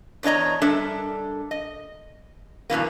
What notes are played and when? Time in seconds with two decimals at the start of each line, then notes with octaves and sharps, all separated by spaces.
0.23 E2 D4 C#5 D#5 A#5
0.62 G3 D4 A4 A#4 E5
1.51 D#5
2.70 G2 B2 E3 A#3